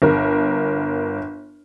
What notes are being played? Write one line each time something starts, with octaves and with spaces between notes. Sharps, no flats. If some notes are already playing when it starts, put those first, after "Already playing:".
G1 A#4